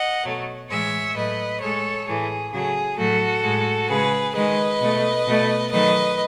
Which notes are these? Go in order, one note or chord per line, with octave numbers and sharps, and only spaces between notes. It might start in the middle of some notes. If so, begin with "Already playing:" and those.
Already playing: D#5 F#5
B2 F#3 A3
A2 E3 G#3 C#5 E5
A2 F#3 A3 B4 D#5
A2 G#3 A4 C#5
A2 E3 A3 G#4
C#3 F#3 A3 G#4
A2 F#3 A3 F#4 A4
A2 G#3
C#3 G#3 G#4 B4
D#3 G#3 B4 D#5
B2 A3
B2 A3
D#3 F#3 A3 B4 D#5